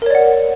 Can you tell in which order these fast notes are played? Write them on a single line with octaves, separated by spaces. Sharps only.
A#4 C#5 D5 F#5